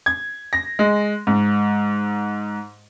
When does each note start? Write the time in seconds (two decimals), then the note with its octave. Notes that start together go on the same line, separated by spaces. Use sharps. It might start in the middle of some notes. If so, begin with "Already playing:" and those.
0.06 G#6
0.53 A#6
0.79 G#3
1.27 G#2